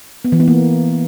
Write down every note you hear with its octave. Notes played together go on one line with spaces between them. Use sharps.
B3
E3
B3
A#3